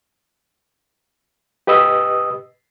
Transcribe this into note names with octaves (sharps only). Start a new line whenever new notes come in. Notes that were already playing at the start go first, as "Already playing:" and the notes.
G4 B4 D#5 D#6 E6